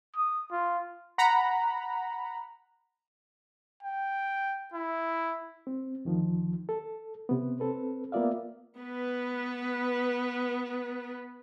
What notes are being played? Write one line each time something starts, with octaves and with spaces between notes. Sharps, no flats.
D#6
F4
F#5 A#5 B5
G5
E4
C4
D2 D#3 F3
A4
C3 B3
C4 A4 B4
A#3 B3 F4 D5 E5 F5
B3 B4